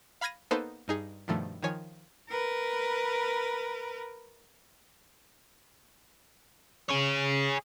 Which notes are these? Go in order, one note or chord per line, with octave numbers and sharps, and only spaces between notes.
F5 B5 F6 G#6 A#6 D#7
A#3 B3 D#4 A4 B4 C5
G2 D#4 G#4
G2 B2 D#3 F3 A3
D#3 F3 C#5 G#5
A#4 B4
G#4 C#5